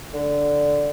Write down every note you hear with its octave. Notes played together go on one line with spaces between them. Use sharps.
D3